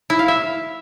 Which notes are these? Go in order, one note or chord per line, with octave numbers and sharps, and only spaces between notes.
E4
F5
E5